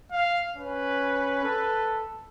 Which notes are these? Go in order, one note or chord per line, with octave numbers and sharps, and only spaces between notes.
F5
C#4 B4
A4